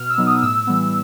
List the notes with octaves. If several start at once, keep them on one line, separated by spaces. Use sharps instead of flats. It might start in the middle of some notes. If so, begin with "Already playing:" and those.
Already playing: B2 F6
E6
F#3 B3 D#4
D#6
A2 E6
E3 G3 B3